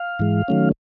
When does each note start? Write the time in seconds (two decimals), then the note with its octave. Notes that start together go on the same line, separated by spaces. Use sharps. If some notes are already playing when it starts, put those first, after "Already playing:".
Already playing: F5
0.19 G#2 E3 G#3
0.48 D#3 F#3 A3 C#4